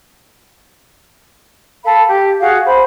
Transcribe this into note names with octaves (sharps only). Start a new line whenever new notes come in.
A4 F5 B5
G4
F#4 G#4 F5
C5 B5